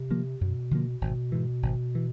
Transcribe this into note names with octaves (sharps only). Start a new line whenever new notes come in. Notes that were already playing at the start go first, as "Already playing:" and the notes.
Already playing: C3
D3 F3 A#3
F#2 B2
D3 F3 A#3
G#1 B2
G#2 E3
G#1
E3